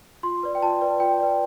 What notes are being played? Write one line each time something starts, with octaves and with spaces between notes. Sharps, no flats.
F4 C6
B4 D5
G5
F4 A5
B4 D5
F4 G5
B4 D5